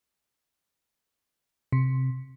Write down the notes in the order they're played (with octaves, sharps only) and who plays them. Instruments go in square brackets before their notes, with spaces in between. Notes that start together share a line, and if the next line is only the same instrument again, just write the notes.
[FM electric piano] C3